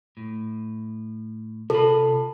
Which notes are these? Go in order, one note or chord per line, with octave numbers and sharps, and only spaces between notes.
A2
C3 F4 A4 B5